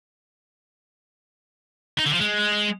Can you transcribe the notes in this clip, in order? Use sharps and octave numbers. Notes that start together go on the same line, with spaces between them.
D#4
D3
F3
G#3